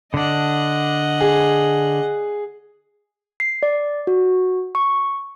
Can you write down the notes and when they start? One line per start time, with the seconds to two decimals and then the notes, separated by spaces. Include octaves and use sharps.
0.14 D3 D4 D#5 F#5
1.21 G#4
3.40 C7
3.63 D5
4.07 F#4
4.75 C#6